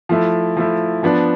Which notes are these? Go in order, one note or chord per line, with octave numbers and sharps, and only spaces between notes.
F3 A3 E4
F3 A3 E4
F3 B3 D4